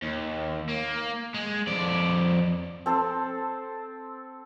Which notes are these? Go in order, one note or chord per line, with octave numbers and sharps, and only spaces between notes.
D#2
A#3
G#3
F2 D5
C4 A4 C5